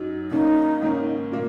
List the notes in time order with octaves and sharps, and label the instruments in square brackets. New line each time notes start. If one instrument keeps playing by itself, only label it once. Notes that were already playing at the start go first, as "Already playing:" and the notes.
Already playing: [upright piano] F#2 F#3 D#4
[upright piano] C#3 A#3 C#4 [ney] D#4
[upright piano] G#2 D#3 A#3 C#4
A#2 A#3